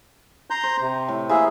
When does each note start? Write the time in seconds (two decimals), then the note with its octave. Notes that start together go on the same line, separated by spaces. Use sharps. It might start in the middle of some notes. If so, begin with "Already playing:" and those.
0.50 A#5 C6 G6
0.63 C5
0.81 C3
1.08 A2
1.29 E3 A#3 G#4 E5 F5